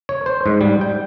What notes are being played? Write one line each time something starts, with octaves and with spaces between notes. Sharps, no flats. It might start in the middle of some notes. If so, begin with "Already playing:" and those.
C#5
C5
G#2
G3
G5